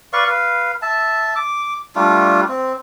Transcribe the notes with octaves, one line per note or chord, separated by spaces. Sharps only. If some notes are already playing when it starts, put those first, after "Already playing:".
B4 D5 F5 C#6
B4 F5
E5 A5
D6
G3 A3 D4 F4
C4